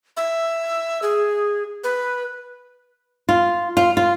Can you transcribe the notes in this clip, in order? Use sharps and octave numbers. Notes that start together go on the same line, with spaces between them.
E5
G#4
B4
F4
F4
F4